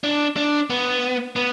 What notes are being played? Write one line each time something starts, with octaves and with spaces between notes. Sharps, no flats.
D4
D4
B3
B3